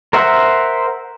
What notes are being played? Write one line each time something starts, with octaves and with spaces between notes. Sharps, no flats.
A#4 C5 E5 F#5